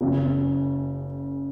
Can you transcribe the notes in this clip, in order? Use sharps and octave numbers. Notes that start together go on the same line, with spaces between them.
F#1 F#2 C#3